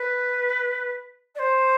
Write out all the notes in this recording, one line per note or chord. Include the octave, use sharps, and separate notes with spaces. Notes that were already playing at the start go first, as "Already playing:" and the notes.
Already playing: B4
D5
C5